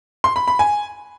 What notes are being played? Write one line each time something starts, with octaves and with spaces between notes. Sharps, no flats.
C6
B5
B5
G#5